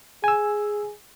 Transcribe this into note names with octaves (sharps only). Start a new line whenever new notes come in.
G#4 G#5 E6